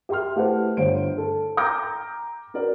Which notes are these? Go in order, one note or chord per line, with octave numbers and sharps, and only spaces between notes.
G4 E5 G5 C6 F6
A3 E4 G4 B4 C5 F#5
G1 C5 C#5 D7
A4
G5 A#5 D6 F6 G6 A#6
C#4 F#4 A#4 B4 D5